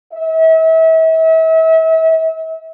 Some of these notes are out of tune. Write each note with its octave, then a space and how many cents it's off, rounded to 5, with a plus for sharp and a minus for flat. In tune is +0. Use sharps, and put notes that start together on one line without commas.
E5 -35